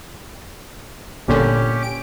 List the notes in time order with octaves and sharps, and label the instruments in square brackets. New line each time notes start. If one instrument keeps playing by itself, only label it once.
[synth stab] G1 A#2 D3 [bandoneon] C#4 G4
[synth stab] D7